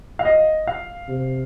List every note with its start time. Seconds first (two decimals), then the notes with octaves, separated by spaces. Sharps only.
0.19 F5
0.25 D#5
0.67 F5
1.09 C3